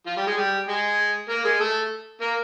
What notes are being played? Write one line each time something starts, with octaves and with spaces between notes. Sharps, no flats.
F3 F4
G3 G4
G#3 G#4
G3 G4
G#3 G#4
A#3 A#4
G#3 G#4
A3 A4
A#3 A#4